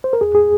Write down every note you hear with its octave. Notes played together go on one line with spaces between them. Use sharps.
C5
A#4
E2 G#4
G#4